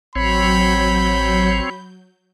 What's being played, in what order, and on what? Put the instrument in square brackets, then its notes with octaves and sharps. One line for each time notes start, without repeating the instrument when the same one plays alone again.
[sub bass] A1 [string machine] F#3 G6 [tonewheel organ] C4 C#5 [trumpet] B5